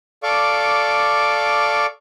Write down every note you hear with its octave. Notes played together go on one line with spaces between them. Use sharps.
A4 D5 F5 C#6 D6